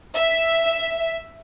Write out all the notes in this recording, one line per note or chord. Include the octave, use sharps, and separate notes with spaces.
E5